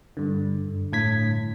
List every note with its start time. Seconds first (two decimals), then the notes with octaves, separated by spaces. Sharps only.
0.17 G2 D3
0.93 A2 G#6 B6